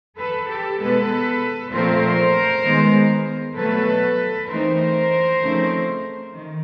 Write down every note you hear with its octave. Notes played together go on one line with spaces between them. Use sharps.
A4 B4
G4 A4
B2 G#3 B3 A4 B4
A#2 F3 A3 C4 F4 A#4 C5
D#3 G#3 B3
B2 F#3 A3 A4 B4
E3 A3 C4 D#4 A#4 C5
C#3 F3 A3 C4 D#4
D#3